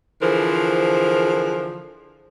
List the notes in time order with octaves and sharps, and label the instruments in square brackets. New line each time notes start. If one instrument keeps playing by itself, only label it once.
[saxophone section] D3 E3 F3 G#4 A#4 C5